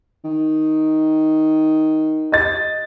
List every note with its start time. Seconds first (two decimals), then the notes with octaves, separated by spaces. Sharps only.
0.24 D#3
2.32 D#5 A6